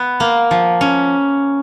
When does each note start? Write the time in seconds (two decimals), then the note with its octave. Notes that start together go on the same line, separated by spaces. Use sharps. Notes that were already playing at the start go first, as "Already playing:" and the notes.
Already playing: B3
0.20 A#3
0.51 F3
0.81 C#4